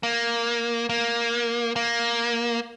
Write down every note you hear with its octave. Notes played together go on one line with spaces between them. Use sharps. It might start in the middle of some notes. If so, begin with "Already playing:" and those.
A#3
A#3
A#3